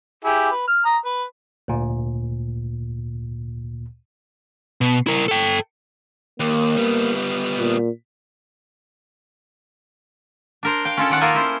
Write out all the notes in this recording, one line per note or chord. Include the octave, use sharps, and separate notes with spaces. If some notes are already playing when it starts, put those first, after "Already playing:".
E4 G4 G#4
B4
F6
A#5 D#6
B4
D2 A#2
B2
E4 A#4
A4 G5
D#2 A#3
G3 B3
A#2
D4 A#4 C5
A#4 F5 G5
C#4 F4 A4 C#5
D#3 D5 F#5
A#3 D#4 F4 A4 A#4 G#5
C#4 E4 C5